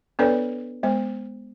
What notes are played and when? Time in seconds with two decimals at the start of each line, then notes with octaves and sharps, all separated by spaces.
0.19 B3 D4 A4 B4 C#5 D5
0.83 G#3 B3 C5